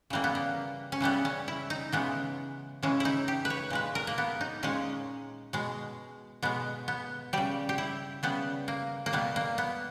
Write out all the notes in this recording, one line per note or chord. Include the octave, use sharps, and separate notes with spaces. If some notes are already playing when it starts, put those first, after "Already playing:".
C#3 E3 G3 A#3
B3
A#3
C#4
C#3 E3 G3 B3
C#4
E4
D#4
C#3 E3 G#3 B3
C#3 E3 G#3 C#4
D#4 E4
G4
B4
C#5
A#2 G#3 B4
A#4
A#3
B3
D#4
A#2 G#3 C#4
B2 G#3
B2 G#3 B3
B3
C#3 G3 G4
G4
E4
C#3 G3 B3
A#3
A#3
B2 G3 B3
A#3
B3